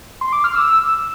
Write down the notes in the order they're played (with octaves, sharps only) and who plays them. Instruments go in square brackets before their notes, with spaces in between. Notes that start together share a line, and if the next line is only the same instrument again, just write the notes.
[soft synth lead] C6
D6
F6
E6